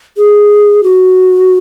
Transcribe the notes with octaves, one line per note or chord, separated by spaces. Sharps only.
G#4
F#4